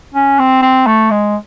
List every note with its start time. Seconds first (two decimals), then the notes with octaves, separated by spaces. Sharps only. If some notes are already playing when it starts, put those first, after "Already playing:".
0.14 C#4
0.39 C4
0.62 C4
0.87 A3
1.11 G#3